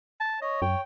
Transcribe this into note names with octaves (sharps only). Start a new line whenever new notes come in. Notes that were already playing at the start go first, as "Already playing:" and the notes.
A5
C#5 D#5
F#2 G5